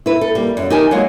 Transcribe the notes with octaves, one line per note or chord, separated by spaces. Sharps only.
E4 B4
A4
G3 A#3
F#2
D#4 G4 A#4 G#5 A5
F#3 G#3 A#3 F4 F#4